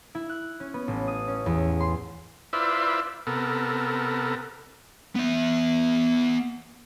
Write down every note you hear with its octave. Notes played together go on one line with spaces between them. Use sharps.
E4
F#6
C#4
B3
A1
D#6
C#4
E2
C6
E4 F4 B4 C5 D5 E5
C3 B3 A4 A#4
B3 E5